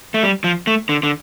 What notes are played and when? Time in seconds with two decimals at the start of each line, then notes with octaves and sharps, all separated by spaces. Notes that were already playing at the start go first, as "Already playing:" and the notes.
0.14 A3
0.23 G3
0.44 F3
0.67 A3
0.89 D3
1.03 D3